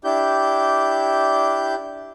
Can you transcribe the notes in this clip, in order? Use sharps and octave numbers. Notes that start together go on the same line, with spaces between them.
D4 E4 G4 G6